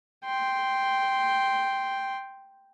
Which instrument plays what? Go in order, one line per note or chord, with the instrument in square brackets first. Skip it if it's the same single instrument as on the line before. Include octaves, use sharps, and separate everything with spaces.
[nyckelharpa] G5 C6